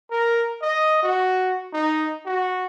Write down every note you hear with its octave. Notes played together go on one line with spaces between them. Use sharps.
A#4
D#5
F#4
D#4
F#4